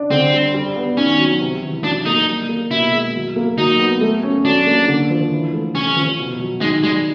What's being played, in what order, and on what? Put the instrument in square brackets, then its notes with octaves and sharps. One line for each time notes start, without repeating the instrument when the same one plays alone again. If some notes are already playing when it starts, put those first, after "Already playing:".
Already playing: [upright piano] D4
[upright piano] D3 [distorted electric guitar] C4
[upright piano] G3
G3
B3
[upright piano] D#3 [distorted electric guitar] C#4
[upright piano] F#3
C3
E3
[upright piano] F#3 [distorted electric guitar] D4
[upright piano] A#3 [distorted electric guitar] D#4
[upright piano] G3
A#3
[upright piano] B2 [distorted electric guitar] E4
[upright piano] G#3
F#3
A#3
[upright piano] F#3 [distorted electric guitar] D#4
[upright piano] B3
A3
C#4
[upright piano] F#3 [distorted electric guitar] D4
[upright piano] A#3
D3
F3
E3
A3
[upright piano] C3 [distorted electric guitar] C#4
[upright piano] F3
B2
F#3
[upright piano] D#3 [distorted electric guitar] G#3
[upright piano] G3 [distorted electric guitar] G#3